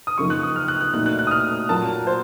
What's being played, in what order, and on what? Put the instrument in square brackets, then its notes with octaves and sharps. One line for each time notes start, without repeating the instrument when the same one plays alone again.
[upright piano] D#6
[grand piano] F#2 C#3 F3 A#3 D#4 [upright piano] C#6
[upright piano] F#6
D#6
F6
F#6
F#6
[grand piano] A#2 A3 D#4 F#4 [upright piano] F#6
[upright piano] F#6
F#6
D#6
F6
[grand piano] A#2 F#3 A#3 F4 [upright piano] A5
[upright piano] C5